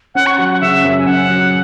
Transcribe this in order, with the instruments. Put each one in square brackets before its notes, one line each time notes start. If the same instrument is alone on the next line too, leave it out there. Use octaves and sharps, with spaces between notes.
[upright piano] C#4 [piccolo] F#5
[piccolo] C#6
[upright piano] F#3 [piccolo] F#5
[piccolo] F#5
[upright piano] C#3 [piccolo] E5
[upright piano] F#2
[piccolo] G#5
[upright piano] C#4 [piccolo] F#5
[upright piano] F#3